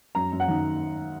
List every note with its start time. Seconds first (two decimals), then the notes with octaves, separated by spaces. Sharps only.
0.15 F#2 A#5
0.32 F#2
0.40 F#5
0.48 D#3